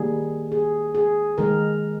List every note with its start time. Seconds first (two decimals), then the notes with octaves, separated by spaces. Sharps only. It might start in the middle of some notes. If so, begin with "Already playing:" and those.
Already playing: D#3 G3 A#3 G#4
0.52 G#4
0.95 G#4
1.38 D#3 G#3 A#4